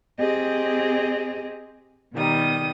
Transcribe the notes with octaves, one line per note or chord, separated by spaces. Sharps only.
C4 G4 G#4 D#5
B2 D#3 G3 D#6